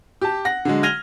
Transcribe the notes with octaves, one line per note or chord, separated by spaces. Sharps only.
G4 A5
F#5 A#6
D3 F#3 G#3
F6 G#6 A#6 D#7 F7 G7